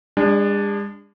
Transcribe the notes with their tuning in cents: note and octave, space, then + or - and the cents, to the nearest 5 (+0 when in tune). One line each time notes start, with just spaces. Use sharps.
G#3 -40 D4 +0